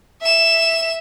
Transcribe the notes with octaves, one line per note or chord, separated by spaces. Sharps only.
E5 E7